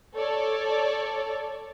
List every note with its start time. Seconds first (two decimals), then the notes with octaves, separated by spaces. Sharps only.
0.16 A4 C#5 D5